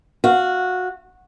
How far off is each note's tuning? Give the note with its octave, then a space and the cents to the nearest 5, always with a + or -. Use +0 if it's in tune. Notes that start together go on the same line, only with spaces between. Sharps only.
F#4 -15 F5 -10